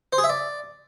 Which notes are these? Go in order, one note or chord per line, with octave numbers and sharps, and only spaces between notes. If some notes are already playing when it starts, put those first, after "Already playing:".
C5
G#4
E5
D5